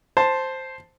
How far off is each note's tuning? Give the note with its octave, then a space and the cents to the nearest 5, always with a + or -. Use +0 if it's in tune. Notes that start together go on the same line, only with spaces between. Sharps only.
C5 +0 A5 +0